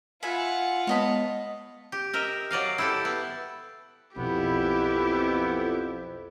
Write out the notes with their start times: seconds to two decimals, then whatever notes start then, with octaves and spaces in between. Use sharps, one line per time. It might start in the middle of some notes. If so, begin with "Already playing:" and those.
0.23 F4 E5 F#5 G#5 B5
0.87 G#3 B3 C#5 D#5 A5 B5
1.92 G4
2.13 A#4 D#5 E5
2.51 F#3 D5 D#5 F5
2.78 E4 G4 A4
3.05 B3
4.16 B1 F2 B3 E4 G4